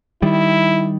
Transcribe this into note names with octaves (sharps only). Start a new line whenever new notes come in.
D#3 G3 E4